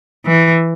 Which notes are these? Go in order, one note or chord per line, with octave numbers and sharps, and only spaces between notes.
E3